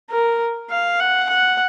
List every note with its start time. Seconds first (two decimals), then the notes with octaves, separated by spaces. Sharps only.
0.10 A#4
0.70 F5
1.00 F#5
1.29 F#5